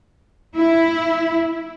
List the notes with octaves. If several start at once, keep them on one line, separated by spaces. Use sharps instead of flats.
E4